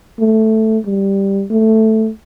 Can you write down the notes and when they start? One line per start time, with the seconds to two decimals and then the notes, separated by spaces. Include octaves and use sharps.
0.19 A3
0.85 G3
1.50 A3